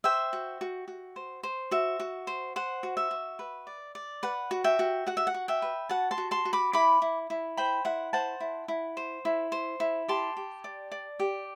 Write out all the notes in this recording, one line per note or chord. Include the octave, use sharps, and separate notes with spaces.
C5 E5 G5
F#4
F#4
F#4
C5
C5
F#4 E5
F#4
C5
C5 F#5
F#4
E5
F#4
B4
D5
D5
B4 F#5
F#4
E5 G5
F#4
F#4 F#5
E5
F#5
F#4
E5 G5
B4
F#4 F#5 A5
A5 C6
F#4
A5 C6
F#4
B5 D6
E4 B5 D6
E4
E4
C5 G5 B5
E4 F#5
C5 F#5 A5
E4
E4
C5
E4
C5
E4
G4 A5 C6
G4
D5
D5
G4